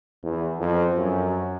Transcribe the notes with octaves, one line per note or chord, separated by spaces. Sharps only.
E2
F2
F#2